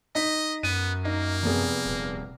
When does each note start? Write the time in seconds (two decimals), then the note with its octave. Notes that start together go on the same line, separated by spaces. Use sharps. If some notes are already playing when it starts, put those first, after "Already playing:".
0.15 D#4 D#5 B6
0.63 F#2 B3 D#7
1.05 A#3 D#4
1.43 F1 B3 G#4
1.86 D#1